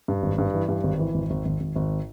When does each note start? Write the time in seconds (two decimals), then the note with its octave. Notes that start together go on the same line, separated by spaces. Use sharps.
0.08 G2
0.22 G#1
0.38 G2
0.54 E3
0.69 G2
0.84 G#1
0.99 E3
1.14 G#1
1.30 G#1
1.45 G#1
1.60 G#1
1.76 G#1